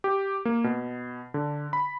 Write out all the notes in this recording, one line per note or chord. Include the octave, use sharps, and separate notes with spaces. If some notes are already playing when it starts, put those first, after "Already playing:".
G4
A#3
B2
D3
B5